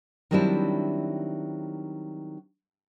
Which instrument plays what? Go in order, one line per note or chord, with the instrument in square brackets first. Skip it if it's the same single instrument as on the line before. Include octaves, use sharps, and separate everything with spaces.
[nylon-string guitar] D#3 F#3 G3 C4 D4 E4